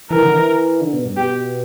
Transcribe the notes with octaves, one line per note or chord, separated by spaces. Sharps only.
E3 A#4
D3
E3
D3
B2
G2
B2 G4